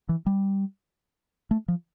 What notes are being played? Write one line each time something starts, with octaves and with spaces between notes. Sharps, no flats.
E3
G3
A3
F3